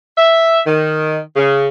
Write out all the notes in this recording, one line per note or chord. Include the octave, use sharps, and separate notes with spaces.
E5
D#3
C#3